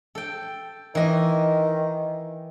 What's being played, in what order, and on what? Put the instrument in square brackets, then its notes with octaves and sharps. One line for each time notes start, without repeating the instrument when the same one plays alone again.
[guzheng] A4 G5
[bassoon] D#3 [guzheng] E3 D#5